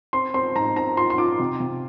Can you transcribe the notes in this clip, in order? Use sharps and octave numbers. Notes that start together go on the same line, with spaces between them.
C4 C6
C4 C6
G#2 A#5
C4 A#5
F4 C6
C6
F4 D6
C3
C3